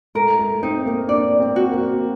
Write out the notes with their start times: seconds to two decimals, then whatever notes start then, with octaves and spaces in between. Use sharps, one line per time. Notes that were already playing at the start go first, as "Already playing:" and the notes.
0.15 A3 A#4
0.39 A3
0.63 C4 D#4
0.86 A#3
1.08 D4 D5
1.40 C4
1.56 F#4
1.71 A#3